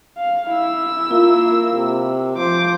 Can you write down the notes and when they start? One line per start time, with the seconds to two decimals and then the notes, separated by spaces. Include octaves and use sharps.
0.18 F5
0.51 E4 E6
1.11 A#3 F4
1.73 C3
2.37 F3 C5 D6